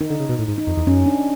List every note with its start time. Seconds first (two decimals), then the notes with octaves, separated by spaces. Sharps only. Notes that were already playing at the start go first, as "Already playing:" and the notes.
0.01 D#3 D#4
0.10 D3
0.20 C#3
0.29 B2
0.39 A2
0.48 G#2
0.58 D#4
0.67 F2
0.77 E2
0.87 F#2 C#4
1.06 D4